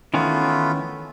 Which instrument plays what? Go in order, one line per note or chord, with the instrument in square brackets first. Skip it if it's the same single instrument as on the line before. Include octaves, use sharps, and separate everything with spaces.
[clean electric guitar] D#3 E3 C#4 [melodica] A3 B3 F4